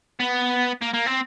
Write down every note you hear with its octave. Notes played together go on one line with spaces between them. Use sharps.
B3
A#3
A#3
C4